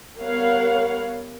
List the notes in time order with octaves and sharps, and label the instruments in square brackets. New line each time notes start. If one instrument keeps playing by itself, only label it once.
[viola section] G3 B3 A#4 C#5 F5 F#5